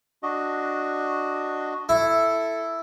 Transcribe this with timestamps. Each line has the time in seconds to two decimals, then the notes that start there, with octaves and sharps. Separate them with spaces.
0.23 D4 F#4 D#5
1.89 E4 A4